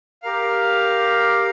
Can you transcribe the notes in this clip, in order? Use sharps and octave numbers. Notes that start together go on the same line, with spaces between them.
G4 A#4 F5